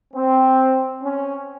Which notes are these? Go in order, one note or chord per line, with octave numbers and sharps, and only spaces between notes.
C4
C#4